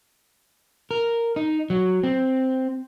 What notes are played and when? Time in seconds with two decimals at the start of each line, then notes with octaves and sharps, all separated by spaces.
0.91 A#4
1.36 D#4
1.70 F#3
2.03 C4